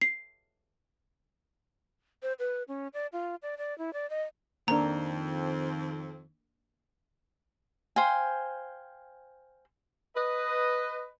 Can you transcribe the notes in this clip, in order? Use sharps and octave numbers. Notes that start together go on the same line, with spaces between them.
C7
C5
B4
C#4
D5
F4
D5
D5
E4
D5
D#5
F2 D#3 A#3 C4 D4 A#5
C5 F5 G5 G#5
B4 D#5